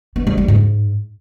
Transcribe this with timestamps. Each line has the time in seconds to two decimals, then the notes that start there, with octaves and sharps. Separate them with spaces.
0.16 B3
0.27 G3
0.38 G3
0.48 G#2